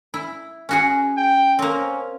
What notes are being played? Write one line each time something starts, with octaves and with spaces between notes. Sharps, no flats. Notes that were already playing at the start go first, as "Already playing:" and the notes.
E4
C#4 F#4 G#4
G5
A#3 C4 C#4